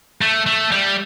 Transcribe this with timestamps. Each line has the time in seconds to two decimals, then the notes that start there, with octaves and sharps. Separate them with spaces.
0.21 A3
0.46 A3
0.72 G3